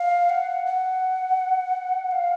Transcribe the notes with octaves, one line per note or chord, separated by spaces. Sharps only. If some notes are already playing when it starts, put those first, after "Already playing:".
Already playing: F5
F#5
F#5
F5